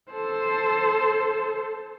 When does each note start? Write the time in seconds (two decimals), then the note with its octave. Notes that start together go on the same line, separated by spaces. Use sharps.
0.11 A4 C5